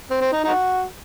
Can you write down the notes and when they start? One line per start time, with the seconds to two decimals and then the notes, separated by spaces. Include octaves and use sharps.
0.11 C4
0.21 C4
0.32 D#4
0.44 D#4 F#4